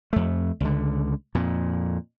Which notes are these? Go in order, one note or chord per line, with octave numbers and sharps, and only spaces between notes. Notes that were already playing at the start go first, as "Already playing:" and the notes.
F2 A3
C#2 D3
F2 A#2